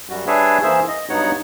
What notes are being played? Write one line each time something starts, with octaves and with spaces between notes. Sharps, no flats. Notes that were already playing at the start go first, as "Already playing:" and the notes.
F#2 G3 F#4
G3 D4 G#4 B4 C#5 E5
E3 A#3 G#4 C5 E5
D#5
G2 F#3 B3 D#4 C#5 F#5